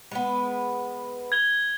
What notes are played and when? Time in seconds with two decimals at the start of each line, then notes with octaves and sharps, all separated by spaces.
0.11 G#3 B3
1.32 G#6 G7